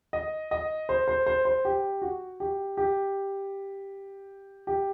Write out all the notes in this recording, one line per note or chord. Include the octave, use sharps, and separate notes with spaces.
D#5
D#5
C5
C5
C5
C5
G4
F#4
G4
G4
G4